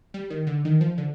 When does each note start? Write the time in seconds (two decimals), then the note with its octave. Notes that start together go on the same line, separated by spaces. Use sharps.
0.14 G3
0.30 D#3
0.47 D3
0.65 D#3
0.81 F3
0.98 D3